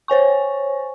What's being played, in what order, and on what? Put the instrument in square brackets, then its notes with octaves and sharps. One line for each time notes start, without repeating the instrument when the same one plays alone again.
[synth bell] C5 C#5 G#5 C#6